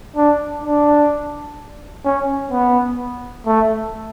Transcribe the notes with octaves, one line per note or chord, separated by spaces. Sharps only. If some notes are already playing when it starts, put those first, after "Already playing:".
D4
D4
C#4
B3
A3